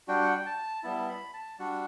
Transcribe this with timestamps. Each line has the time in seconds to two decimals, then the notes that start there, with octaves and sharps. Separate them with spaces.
0.08 G3 D4 F#4 G5
0.23 F#5
0.35 G5
0.46 A5
0.83 G3 B3 E4 A5
1.08 B5
1.33 A5
1.59 G3 D4 F#4 F#5